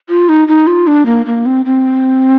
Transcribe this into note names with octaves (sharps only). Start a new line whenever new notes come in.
F4
D#4
D#4
F4
D4
A#3
A#3
C4
C4